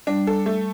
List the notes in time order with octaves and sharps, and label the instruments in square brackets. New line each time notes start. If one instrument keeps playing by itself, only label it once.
[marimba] G3 [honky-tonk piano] D4
[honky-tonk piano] A4
A3